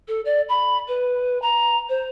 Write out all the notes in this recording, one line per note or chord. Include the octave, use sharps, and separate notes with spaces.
A4
D5
B5
B4
A#5
C5